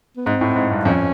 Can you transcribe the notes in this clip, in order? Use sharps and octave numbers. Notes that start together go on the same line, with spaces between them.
B3
G#2 C4
A2
G#2
G2
F2 C#4